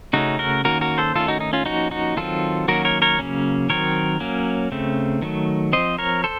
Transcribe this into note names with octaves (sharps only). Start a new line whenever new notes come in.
C#3 A3 C#4 D#4 F#4
F#4 A#4
D#3 A#3 C#4 F#4 A#4
F#4 A#4
A4 C5
D#3 A3 C#4 F4 A4
D#4 F#4
D#4
C#4 F4
F3 A#3 C#4 D#4 F#4
D#4 F#4
D#3 F#3 C4 F4 A4
D#3 F#3 A#3 C#4 F#4 A#4
A#4 C#5
A#4 C#5
C#3 F#3 A#3 C#4
D#3 F#3 C4 A#4 C#5
F#3 A#3 C#4
C#3 A3 C4
D#3 F#3 A3
F3 C4 C5 D#5
A#4 C#5
A4 C5